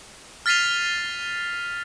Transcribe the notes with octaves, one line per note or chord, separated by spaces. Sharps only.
F6 A6 B6 C7 D#7 F7